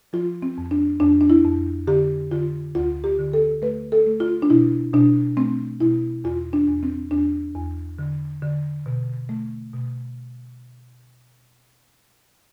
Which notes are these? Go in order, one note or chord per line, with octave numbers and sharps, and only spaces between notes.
F3 F4
C4
F2
D4
F2 D4
D4
E4
F2
D3 G4
D3 F4
D2 F4
G4
D3
A4
A3 B4
A4
A3
F4
D4
B2 E4
B2 D4
A3 C4
B2 E4
E2 F4
D4
E2
C4
E2 D4
E2
D3
D3
B2
A3
B2